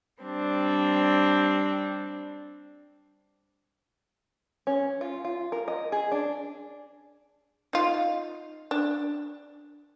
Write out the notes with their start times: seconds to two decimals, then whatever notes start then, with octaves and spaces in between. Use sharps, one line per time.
0.21 G3 C4 D4
4.67 C#4
5.01 F4
5.25 F4
5.52 A#4
5.68 D#5
5.92 G#4
6.12 D4
7.73 D#4 F4
8.71 D4